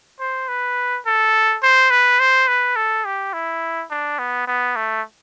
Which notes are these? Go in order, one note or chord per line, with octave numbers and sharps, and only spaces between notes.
C5
B4
A4
C5
B4
C5
B4
A4
G4
E4
D4
B3
B3
A3